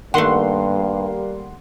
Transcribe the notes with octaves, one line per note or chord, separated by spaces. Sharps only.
G2 D#3 G3 A3 A#3 F#5 C6